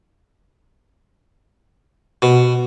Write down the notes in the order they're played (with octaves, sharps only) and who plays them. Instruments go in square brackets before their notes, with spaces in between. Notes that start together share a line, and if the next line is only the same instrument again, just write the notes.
[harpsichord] B2